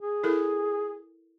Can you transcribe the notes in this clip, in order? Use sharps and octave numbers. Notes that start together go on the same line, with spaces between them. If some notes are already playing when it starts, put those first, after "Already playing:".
G#4
E4 A4 A#4